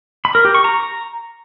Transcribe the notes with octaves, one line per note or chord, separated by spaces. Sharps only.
B5
A#4
G4
C#6
A#5